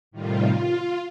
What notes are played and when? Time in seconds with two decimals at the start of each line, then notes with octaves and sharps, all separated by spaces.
0.11 A2 C3 D#3 G3 F4
0.51 F4